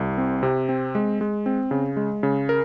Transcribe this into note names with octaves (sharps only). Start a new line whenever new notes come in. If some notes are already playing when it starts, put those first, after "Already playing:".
Already playing: C2
C4
C3
C4
G#3
G#3
C4
C#3
G#3
C#3
A#4